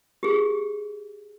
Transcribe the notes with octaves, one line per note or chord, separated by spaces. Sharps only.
G4 G#4